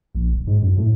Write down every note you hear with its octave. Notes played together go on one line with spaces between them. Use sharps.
A#1
D#1
G#2
F#2
A2